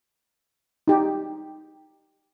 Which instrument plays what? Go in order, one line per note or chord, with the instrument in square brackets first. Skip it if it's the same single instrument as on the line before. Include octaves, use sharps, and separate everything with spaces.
[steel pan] D#4 G4